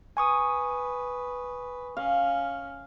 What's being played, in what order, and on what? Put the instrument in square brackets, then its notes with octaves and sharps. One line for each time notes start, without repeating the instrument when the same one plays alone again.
[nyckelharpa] B4 [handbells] G#5 C#6 D#6
[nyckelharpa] C#4 [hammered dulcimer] F5